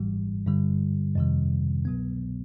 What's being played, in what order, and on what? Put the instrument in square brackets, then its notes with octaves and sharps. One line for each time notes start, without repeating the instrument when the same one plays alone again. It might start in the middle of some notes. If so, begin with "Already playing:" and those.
Already playing: [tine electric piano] G#1 G#2 E3 G3
G2 D3 G3
F2 C3 D#3 G3
C2 B2 F#3 B3